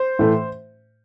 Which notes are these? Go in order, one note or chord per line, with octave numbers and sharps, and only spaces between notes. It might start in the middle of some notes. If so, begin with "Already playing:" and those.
Already playing: C5
A2 E3 A3